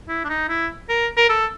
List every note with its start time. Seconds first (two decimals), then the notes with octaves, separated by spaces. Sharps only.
0.09 E4
0.24 D4
0.29 D#4
0.49 E4
0.89 A#4
1.17 A#4
1.29 A4